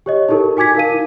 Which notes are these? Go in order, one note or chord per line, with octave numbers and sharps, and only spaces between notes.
G4 C#5 D#5
D#4 E4 G4 A4 A#4
F#4 G#5 D6 G#6 B6
D#4 A#4 F5 D#7
E4